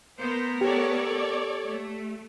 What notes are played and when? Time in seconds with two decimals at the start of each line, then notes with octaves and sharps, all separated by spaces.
0.19 A3 B3 A#4 C5
0.61 G4 A4 C#5 D5
1.67 A3